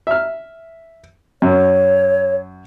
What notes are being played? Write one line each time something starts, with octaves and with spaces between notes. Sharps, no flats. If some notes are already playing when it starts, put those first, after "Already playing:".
E5 F6
F#2 C#5